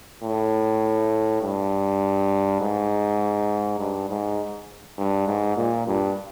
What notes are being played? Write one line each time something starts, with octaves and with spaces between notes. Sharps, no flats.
A2
G2
G#2
G2
G#2
G2
G#2
A#2
G2